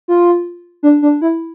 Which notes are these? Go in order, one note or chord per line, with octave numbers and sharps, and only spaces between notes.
F4
D4
D4
E4